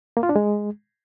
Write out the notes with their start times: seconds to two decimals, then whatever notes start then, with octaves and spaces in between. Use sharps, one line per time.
0.17 A#3
0.23 F4
0.29 D4
0.36 G#3